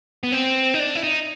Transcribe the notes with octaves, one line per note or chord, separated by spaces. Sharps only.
B3
C4
D#4
D4
E4
D#4